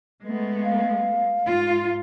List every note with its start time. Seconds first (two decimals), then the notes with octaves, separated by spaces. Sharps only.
0.24 G#3 A3 B3
0.64 F5
1.45 G#2 F4